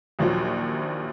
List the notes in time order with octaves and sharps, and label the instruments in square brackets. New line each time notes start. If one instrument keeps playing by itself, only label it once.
[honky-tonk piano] A#1 D#2 F3 F#3